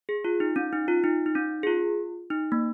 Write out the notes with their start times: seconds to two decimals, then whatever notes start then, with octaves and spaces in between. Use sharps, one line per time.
0.09 G#4
0.25 F4
0.40 D#4
0.56 C#4
0.73 D#4
0.88 F4
1.04 D#4
1.26 D#4
1.35 C#4
1.63 G#4
1.67 F4
2.30 D#4
2.52 A#3